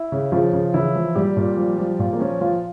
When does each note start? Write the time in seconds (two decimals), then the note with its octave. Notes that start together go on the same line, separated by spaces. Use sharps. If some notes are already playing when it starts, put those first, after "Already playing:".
Already playing: E4 E5
0.12 C#3
0.32 C#3 F3 F4
0.53 C#3
0.74 C#3 E3 E4
0.95 F3
1.15 A#2 G3 G4
1.37 A#2
1.57 F3
1.78 F3
1.99 A#2 F3 F4
2.13 A#3
2.20 F3 C#4
2.41 F3 F4